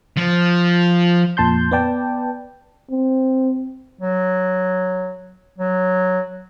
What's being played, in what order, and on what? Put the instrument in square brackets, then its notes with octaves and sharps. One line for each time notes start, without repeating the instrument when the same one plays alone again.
[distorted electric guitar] F3
[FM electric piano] F2 A#2 A5 C6 G6
B3 B4 D5 G5 A5
[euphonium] C4
[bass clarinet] F#3
F#3